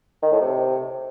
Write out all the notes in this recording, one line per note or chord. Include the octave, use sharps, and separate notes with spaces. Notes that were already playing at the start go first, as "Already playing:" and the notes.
D#3
A2
C3